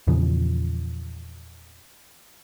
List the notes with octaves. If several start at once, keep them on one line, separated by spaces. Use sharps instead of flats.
E2 A#2 C#3 F3